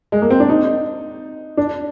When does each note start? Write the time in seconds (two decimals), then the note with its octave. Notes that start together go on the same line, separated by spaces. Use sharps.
0.12 G#3
0.22 A#3
0.30 C4
0.40 D4
0.49 D#4
1.57 D4